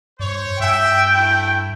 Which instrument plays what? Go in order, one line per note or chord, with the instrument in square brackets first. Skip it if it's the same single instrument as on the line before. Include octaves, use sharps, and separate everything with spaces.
[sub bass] G2 [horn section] C5 C#5
[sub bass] G2 [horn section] E5 [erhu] G5
[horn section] A3 E4